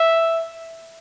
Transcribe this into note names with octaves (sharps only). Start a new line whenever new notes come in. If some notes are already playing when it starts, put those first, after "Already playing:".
Already playing: E5